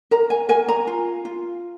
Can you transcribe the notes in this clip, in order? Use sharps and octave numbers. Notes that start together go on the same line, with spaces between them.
A#4 A#5
G#5
A#4 G#5
A#5
F4
F4